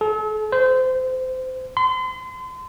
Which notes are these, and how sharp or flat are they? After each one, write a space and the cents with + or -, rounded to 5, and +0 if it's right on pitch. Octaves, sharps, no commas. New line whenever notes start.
A4 -40
C5 -25
C6 -35